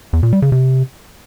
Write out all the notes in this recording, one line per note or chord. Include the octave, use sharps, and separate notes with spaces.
E2
A#2
G3
C#3
C3